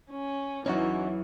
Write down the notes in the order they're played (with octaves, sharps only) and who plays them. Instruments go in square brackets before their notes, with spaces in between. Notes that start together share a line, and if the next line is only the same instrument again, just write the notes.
[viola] C#4
[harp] E2 F#3 [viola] E3 [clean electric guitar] C#4 D#4 F#4